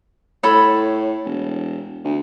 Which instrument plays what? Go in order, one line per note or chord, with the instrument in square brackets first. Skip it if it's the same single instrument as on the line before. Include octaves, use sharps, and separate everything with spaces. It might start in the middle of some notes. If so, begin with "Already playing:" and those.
[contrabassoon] A2 [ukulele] A4 C#5 B5
[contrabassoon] E1
D2